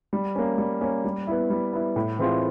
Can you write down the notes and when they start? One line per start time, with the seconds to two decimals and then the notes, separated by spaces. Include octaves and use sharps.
0.13 G3
0.35 A#3 C#4
0.58 G3
0.81 A#3 C#4
1.04 G3
1.27 B3 E4
1.50 G3
1.73 B3 E4
1.96 A2
2.19 E3 G#3 C4 F4